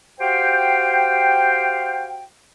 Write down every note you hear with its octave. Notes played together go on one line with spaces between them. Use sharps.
F#4 G4 C5 F5 G5